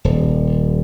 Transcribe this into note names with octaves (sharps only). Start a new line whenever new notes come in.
D#1